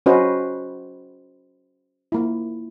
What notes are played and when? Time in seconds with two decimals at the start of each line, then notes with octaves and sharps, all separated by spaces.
0.06 C#4 F#4 B4 C5 D#5
2.12 A#3 E4